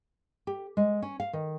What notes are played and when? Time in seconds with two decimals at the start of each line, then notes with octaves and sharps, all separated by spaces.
0.47 G4
0.77 G#3
1.02 C#4
1.20 F5
1.33 D#3